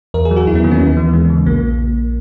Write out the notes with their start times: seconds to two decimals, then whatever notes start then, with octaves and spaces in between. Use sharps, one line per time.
0.14 E2 A#4
0.25 G#4
0.31 F#3
0.36 F#4
0.47 E2 E4
0.55 B3
0.64 D#3 A#3
0.71 C#4
0.80 D#2 B3
0.97 E3
1.13 G#3
1.30 C#3
1.46 A#1 A#3